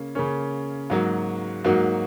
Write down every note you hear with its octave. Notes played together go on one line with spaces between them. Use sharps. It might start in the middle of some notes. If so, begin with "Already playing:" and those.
Already playing: C#3 A#3 C#4
C#3 A#3 C#4
G#2 F#3 A#3 F#4
G#2 F#3 A#3 F#4